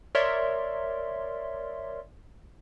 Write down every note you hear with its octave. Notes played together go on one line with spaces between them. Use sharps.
A#4 C#5 D5 E5 C6